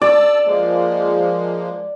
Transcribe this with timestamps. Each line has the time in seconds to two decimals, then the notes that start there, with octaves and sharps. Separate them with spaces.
0.02 D5 A5 E6
0.45 F3 G#3 A#3